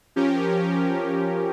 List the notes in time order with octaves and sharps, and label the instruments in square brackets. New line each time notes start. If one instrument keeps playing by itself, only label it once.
[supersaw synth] F3 C#4 G4 A#4